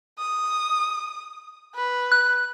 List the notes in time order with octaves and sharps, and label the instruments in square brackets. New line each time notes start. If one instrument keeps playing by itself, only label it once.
[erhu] D#6
B4
[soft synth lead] F#6